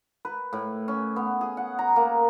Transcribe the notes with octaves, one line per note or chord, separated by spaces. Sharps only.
B4
A2
C#4
B3
G#4
F#5
A#5
A#3